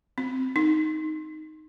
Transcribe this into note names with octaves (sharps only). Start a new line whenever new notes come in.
C4
D#4